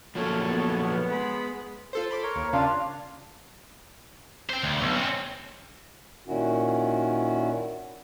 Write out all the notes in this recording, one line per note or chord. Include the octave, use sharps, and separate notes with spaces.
F3 F#3 A#3 A4 C#5
B3
G#3 B5
F4 A4 C5
B5 C6 D6
A#4 C#5
D#2
C#3 D4 F4 F5
C5 G5
D2
B1
C4 C#4
A#2 D#3 C#4 E4 F#4